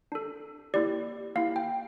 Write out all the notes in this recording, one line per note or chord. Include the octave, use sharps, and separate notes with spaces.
D4 A4
A#3 E4 G4 D5
A#3 E4 G4 F5
G5